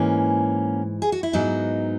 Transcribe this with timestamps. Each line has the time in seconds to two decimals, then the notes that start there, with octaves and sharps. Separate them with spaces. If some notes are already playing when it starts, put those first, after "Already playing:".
Already playing: G#2 E3 A#3 C#4
1.02 G#4
1.12 F#4
1.23 E4
1.33 G#2 F#3 B3 D#4